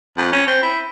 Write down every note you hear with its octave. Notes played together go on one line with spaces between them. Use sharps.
F2
C#4
C4
E4